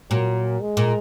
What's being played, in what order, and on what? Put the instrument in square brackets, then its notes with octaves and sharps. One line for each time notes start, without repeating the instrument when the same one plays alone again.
[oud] A#2 [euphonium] F#3
[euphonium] G#3
[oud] A#2